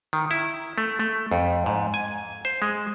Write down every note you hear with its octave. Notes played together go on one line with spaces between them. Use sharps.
D#3
E4
A3
A3
F2
G#2
G#5
C5
G#3